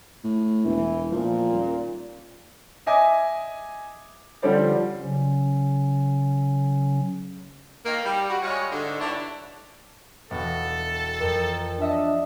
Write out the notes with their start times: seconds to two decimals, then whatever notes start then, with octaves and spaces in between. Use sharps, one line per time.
0.24 A2
0.65 E1 E3
1.12 A#2 F3
1.51 D#1
2.86 D#5 E5 G#5 D6 D#6
4.42 D3 F3 G3 A4 C5 D5
5.00 C#3 F#3 C#4
7.86 D#3 A#3
8.05 G3
8.30 F#4
8.42 G3 G#3 F4 F#4 C#5
8.72 G#2 D3
8.99 G2 D3 D4 E4 A4 C#5
10.31 E1 F#4 A4
11.21 F2 A#4
11.79 D4 D#5 E5 A5